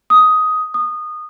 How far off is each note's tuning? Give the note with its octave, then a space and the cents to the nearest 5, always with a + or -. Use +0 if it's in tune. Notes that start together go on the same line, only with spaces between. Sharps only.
D#6 +10
D#6 -20